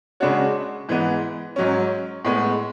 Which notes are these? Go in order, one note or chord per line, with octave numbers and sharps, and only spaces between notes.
C#3 G#3 D4 F#4 C#5
G#2 E3 G#3 B3
G#2 F#3 C#4
A2 G#3 B3